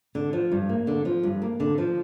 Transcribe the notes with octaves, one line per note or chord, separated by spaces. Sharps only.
D3
F3
G2
A#3
D3
F3
G2
A#3
D3
F3